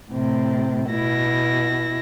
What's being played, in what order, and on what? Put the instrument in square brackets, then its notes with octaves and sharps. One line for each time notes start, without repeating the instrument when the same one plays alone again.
[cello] A2 C3
[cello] B2 [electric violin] E4 A#6